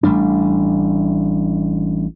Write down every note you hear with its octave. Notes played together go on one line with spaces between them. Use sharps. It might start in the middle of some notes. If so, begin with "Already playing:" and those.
A1 G3 A3 D4